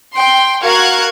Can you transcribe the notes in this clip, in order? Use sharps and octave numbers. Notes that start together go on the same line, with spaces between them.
G5 C6
F#4 A#4 F5 C#6 F#6 G#6